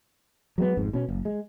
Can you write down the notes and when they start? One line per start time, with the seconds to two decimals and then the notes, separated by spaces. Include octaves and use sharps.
0.58 F#3 G#3 A#3 B3
0.77 G#1 F2 G#2
0.93 B2 C#4
1.09 F#1
1.25 G#3